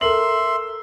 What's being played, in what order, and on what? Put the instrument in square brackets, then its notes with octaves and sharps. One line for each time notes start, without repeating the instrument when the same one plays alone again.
[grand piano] A4 A#4 F#7 [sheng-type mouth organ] E5 C6